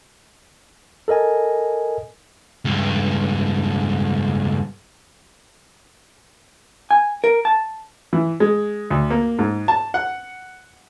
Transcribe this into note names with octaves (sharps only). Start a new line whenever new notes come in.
A4 A#4 D#5 G#5
C#2 G2
G#5
A#4
A5
E3
G#3
D2
A#3
G#2
A5
F#5